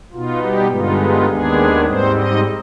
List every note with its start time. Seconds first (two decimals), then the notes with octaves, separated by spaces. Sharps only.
0.13 B2 B3 D#4 F4
0.42 G3 G4
0.70 G2 D3 G#3 B3 D#4 F4
1.00 F4
1.28 D#2 D#3 G#3 B3 D4 G#4
1.85 G#2 G3 C4 D#4 C5
2.14 D#4 D#5